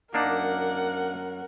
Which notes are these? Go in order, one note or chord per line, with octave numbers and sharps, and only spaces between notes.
F#2 A#3 D4 D#4 A#4 F#5